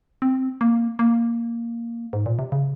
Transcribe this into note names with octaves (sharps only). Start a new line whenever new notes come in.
C4
A#3
A#3
G#2
A#2
C3
C#3